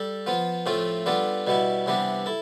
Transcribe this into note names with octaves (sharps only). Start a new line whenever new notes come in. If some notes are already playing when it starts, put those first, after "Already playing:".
Already playing: G3 A4
F3 B3 F4
A2 F3 A3 C4 F4
G3 B3 D4 F4 A4
B2 G3 B3 E4
C3 E3 G3 B3 D4
E4 A4